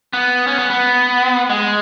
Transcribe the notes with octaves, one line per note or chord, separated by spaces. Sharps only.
B3
C#4
B3
B3
G#3